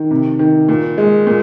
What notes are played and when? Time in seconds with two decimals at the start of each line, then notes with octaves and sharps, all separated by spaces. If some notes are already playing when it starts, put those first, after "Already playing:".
Already playing: D#3
0.11 C3
0.39 D#3
0.69 A#2
0.98 G#3
1.27 A#2